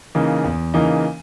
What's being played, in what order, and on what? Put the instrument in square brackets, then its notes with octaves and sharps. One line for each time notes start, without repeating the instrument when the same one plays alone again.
[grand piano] C#3 E3 A#3 D#4
E2
C#3 E3 A#3 D#4